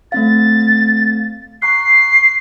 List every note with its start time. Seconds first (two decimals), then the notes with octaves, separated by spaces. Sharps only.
0.12 A3 C4 F5 A6
1.62 A#5 C#6 F#6 C7